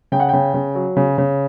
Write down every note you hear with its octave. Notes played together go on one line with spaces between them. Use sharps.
C#3 G5
F#5
C#3 G5
C#3
F#3
C#3
C#3